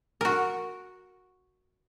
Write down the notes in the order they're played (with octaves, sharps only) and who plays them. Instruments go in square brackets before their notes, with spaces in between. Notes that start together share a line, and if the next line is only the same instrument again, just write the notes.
[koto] F#4 A#4